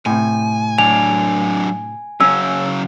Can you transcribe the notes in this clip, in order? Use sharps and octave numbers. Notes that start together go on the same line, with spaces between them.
A2 C3 G#5
F#3 D4 G#5 F7
C#3 F#3 C#4 E6